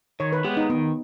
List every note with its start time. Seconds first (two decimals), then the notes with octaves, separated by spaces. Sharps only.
0.20 D#3 C#5
0.32 B4
0.44 G#3 B3 G4
0.57 D#4
0.70 D#3 B3